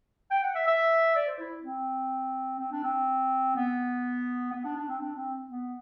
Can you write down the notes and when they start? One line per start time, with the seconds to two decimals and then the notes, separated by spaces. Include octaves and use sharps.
0.31 G5
0.43 F#5
0.55 E5
0.67 E5
1.16 D5
1.27 C5
1.39 E4
1.63 C4
2.60 C4
2.72 D4
2.84 C4
3.56 B3
4.52 B3
4.65 D4
4.77 D4
4.88 C4
5.01 D4
5.16 C4
5.49 B3